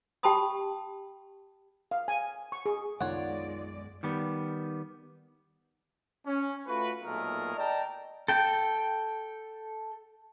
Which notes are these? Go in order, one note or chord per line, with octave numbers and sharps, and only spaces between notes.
G4 G5 A5 B5 C6 D#6
F5
G#5
C#6
G#4
F#2 D#3 G#3 B3 F4 C#5 D5 F#5
D#3 G3 B3
C#4
A3 F4 F#4 B4
B1 A#2 A3 G#4 A#4
D5 D#5 G5 A5 A#5
A4 G5